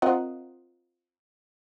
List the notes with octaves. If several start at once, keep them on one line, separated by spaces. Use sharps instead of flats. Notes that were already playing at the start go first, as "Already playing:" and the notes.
C4 F4 A#4 D#5 F#5